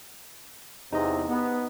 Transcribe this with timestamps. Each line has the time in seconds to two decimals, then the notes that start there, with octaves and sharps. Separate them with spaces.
0.92 E2 C3 D#4 D#5
1.28 B3